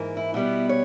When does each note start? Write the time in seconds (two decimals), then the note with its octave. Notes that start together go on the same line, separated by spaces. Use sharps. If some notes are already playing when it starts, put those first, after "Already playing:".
Already playing: G#2 E3 A#3
0.17 E4
0.34 B2 G3 B3 E4
0.69 C#5